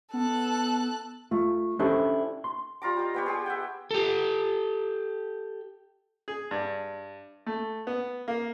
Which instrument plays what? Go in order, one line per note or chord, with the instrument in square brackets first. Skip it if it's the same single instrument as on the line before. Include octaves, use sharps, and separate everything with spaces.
[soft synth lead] B3 [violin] A4 F#6
[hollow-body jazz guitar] A3 F4
C#4 D4 E4 G4 A4 C5
C6
[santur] G3 F4 A#5 D6
G4 D#5
B3 G4 C#5
G4 G#4
E5 F#5 G5
[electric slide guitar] G4 A4
[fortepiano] G#4
G2
A3
B3
A#3